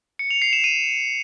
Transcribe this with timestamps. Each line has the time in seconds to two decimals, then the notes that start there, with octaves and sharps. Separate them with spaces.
0.19 C#7
0.31 F7
0.42 C7
0.53 E7
0.64 D#7